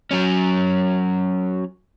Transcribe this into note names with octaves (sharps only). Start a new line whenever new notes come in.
F#3 C#4